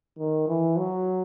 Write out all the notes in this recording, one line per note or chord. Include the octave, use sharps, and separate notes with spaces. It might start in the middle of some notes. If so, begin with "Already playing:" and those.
D#3
E3
F#3